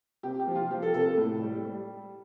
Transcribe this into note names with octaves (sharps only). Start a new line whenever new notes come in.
C3 G4
G4
F3
F4
F3 G4
A4
C3 A4
A4
A2
G3
G3